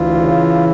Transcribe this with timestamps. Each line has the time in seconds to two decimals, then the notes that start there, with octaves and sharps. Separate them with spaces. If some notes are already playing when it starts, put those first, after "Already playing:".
Already playing: D2 E3 F4
0.14 C#3